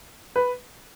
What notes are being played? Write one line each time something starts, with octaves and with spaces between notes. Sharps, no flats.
B4